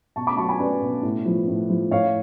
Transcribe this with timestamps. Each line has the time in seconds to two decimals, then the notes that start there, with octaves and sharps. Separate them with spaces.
0.16 B2 A5 C#6
0.27 B5 D6
0.38 F#3 A5 C#6
0.49 G#5 B5
0.59 C#4 B4 D5
0.82 B2
1.03 A2
1.26 F3
1.48 A2
1.70 F3
1.91 A2 C#5 F5